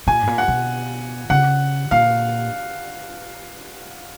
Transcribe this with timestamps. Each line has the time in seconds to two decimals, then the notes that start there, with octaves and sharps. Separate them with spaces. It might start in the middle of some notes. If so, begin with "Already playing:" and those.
0.07 A#2 G#5
0.23 G#2
0.27 A#2
0.38 F#5
0.48 B2
1.30 C#3 F#5
1.91 A#2 F5